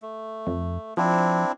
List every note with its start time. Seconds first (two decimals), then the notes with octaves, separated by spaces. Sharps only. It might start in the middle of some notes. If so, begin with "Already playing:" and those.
0.02 A3
0.47 F2
0.97 F3 C4 D4 E4